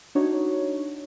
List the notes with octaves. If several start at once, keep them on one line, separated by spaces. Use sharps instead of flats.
D4 D#4 F#4 C#5